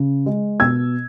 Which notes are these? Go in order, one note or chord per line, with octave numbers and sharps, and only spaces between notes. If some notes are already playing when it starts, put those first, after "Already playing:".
Already playing: C#3
G#3
B2 E6 G#6